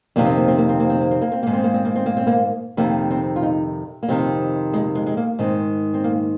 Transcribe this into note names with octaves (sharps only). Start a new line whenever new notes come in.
F2 C3 D#3 A#3
C4
A#3
C4
A#3
C4
A#3
C4
A#3
C4
A#3
C4
G#2 D#3 A#3
C4
A#3
C4
A#3
C4
A#3
C4
A#3
F2 C3 D#3 A#3
C4
F4
D#4
A#3
F2 C3 D#3 C4
G#3
G#3
G#3
A#3
G#2 D#3 C4
C4
A#3